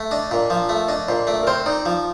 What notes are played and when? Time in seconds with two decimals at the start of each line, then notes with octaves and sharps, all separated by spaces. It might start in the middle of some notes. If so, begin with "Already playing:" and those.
Already playing: A3
0.11 D4 D#5
0.31 A#2
0.50 F3
0.69 A3
0.88 D4 D#5
1.08 A#2 C5
1.27 A3 D5
1.43 A#4
1.47 C4 C5
1.66 D#4 D5
1.86 F3